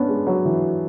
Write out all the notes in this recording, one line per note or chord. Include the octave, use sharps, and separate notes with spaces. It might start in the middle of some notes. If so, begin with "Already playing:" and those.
Already playing: B3 C#4 D4
G#3
F#3
E3